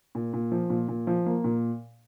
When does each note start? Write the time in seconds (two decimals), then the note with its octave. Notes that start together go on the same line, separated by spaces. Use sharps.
0.15 A#2
0.34 A#2
0.52 F3
0.70 A#2
0.88 A#2
1.07 F3
1.26 A#3
1.44 A#2